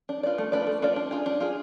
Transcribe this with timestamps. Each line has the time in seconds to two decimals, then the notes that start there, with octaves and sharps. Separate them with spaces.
0.09 D4
0.23 F4 B4 D5
0.38 A3
0.52 D4 F4 B4 D5
0.67 A3
0.82 D4 F4 B4 D5
0.96 D4
1.11 F4 G#4
1.26 D4
1.40 F4 G#4